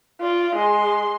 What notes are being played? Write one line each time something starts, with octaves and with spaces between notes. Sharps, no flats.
F4 D5
G#3 C6